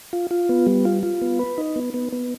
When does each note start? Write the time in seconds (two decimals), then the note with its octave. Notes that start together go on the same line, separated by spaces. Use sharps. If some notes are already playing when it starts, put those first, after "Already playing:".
0.13 F4
0.31 F4
0.49 B3
0.66 G3
0.85 F4
1.03 F4
1.21 B3
1.39 B4
1.58 D#4
1.76 B3
1.94 B3
2.12 B3